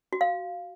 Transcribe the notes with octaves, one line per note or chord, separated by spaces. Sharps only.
F#4
F5